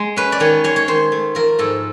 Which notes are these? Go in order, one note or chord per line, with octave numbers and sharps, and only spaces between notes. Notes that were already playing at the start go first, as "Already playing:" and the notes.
Already playing: G#3
C#4 B4
D5
D#3 C#5
G#3 C#5
C#5
D#3 C5
A3
F3 A#4
G#2 A4